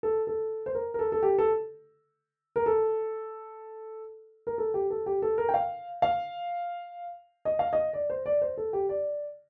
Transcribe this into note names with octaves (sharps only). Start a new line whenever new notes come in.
A4
A4
C5
A#4
A#4
A4
A4
G4
A4
A#4
A4
A#4
A4
G4
A4
G4
A4
A#4
G5
F5
F5
D#5
F5
D#5
D5
C5
D5
C5
A4
G4
D5